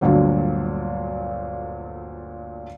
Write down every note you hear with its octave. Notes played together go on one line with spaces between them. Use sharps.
G1 D2 A#2 D3 F#3